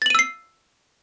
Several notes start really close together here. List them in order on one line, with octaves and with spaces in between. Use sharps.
A6 F#7 D#7 E6 C7